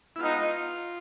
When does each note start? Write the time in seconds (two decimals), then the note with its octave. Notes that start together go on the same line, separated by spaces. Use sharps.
0.16 E4
0.20 G#3 B3 D#4 F4